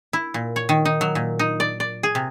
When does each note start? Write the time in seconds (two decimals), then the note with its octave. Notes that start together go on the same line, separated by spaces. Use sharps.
0.13 E4
0.34 A#2
0.56 C#5
0.69 D#3
0.85 D#4
1.01 F#3
1.15 A#2
1.39 D#4
1.60 D5
1.80 D5
2.03 G#4
2.15 C3